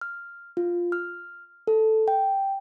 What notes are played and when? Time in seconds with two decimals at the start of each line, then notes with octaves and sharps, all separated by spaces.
0.01 F6
0.57 F4
0.92 F6
1.67 A4
2.08 G5